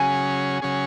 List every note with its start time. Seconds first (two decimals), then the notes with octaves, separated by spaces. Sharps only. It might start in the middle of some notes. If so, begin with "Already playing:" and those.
Already playing: C#3 F#3 C#4 G#4 G#5
0.62 C#3 F#3 C#4 G#4